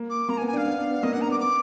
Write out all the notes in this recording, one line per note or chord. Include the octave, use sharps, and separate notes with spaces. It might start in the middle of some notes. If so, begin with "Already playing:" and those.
Already playing: A#3
D6
A#3 A#5
G#5
B3
G#5
D4 F5
B3
D4
B3
A#3 D#5
D4 F#5
A#5
B3 D6
B3 D6